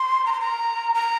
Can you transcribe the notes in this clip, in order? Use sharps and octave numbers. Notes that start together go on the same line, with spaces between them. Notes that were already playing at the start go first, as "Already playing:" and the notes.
Already playing: C6
A#5
C6
A#5
A#5